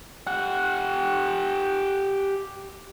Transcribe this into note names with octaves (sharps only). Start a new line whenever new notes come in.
G4 F#5